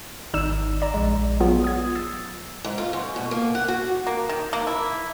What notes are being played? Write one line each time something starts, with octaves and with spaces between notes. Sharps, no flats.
G#1 D#4 D5 E6 E7
D5 A#5
A#1 G#3
F#3 B3 F4 G#4
D#6 G#6
E6 A6 C7
G#2
F4
F#2
B2
A#3
F#5
F#4
A#3
D#3
A#3
E4